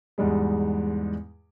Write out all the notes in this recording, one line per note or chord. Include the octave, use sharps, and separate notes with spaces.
E2 G#2 G3 G#3